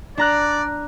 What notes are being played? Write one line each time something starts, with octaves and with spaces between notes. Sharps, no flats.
D4 D5 A#5 F#6